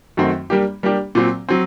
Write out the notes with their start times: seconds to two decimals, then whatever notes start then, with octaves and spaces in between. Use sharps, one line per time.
0.17 F#2 D#3 A3 C4 F#4
0.50 G3 A#3 D4 G4
0.83 G3 A#3 D4 G4
1.15 A#2 F#3 C4
1.49 F#3 C4